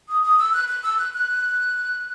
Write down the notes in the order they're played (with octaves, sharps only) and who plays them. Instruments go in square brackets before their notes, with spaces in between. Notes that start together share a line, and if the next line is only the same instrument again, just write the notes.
[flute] D#6
D#6
E6
F#6
F#6
E6
F#6
F#6